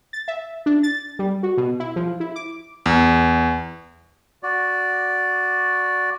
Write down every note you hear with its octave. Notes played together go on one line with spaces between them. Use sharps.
A6
E5
D4
A6
G3
F#4
B2
E4
F3
E4
D6
E2
F#4 D5